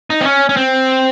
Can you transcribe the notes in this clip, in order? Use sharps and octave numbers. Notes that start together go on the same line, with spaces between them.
D#4
C4
C#4
C#4
C4